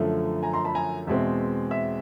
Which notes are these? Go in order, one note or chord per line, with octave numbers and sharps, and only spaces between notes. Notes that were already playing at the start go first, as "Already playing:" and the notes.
Already playing: F#2 D3 F3 A3
G#5 A#5
A#5 C6
A5 B5
G#5 A#5
E2 B2 G#3 C4 E5
E5